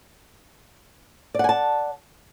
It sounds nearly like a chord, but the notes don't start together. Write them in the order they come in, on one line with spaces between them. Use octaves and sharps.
D5 F#5 G#5 A5